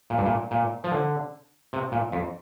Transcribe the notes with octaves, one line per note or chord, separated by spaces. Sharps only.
A#2
G2
A#2
A#2
F3
D3
C3
A#2
F2